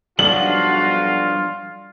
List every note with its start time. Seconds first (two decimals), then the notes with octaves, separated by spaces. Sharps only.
0.19 B1 F3 G3 D4 F4 F#4 F#7